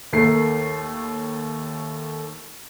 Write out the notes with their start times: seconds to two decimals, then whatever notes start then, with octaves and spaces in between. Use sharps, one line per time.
0.13 D#2 A3 A#4 C7